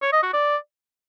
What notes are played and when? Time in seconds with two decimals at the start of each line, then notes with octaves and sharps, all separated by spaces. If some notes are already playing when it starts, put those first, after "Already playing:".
0.02 C#5
0.13 D#5
0.23 F#4
0.33 D5